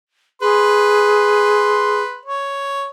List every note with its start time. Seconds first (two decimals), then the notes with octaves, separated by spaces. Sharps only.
0.42 G#4 B4 C6
2.25 C#5